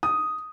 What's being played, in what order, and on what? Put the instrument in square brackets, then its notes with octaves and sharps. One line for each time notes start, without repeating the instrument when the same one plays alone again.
[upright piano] D#6